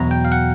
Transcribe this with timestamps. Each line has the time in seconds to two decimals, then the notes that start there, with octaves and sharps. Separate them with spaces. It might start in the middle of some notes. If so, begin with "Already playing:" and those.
Already playing: E2 B2 F#3 A#5
0.11 G5
0.25 F5
0.32 F#5